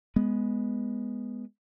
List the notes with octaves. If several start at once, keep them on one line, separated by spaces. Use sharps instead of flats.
G#3 B3